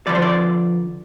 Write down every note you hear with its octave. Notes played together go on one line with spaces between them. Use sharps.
D3 F3 D5
C5
D5